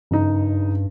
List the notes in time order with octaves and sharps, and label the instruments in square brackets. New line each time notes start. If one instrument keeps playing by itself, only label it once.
[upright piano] F#1 D#4 [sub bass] G2